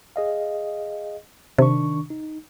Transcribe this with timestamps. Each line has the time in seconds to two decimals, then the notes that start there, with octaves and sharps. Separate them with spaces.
0.16 G#4 D#5 F5
1.58 C3 D#3 D4 C#6
2.10 D#4